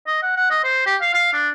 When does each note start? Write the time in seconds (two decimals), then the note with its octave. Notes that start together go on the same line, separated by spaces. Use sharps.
0.07 D#5
0.22 F#5
0.37 F#5
0.51 D#5
0.64 C5
0.86 G4
1.01 F5
1.14 F5
1.33 D4